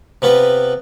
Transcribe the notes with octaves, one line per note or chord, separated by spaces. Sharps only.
C3 B3 F4 B4